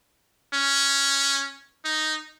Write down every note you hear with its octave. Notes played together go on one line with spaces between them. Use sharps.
C#4
D#4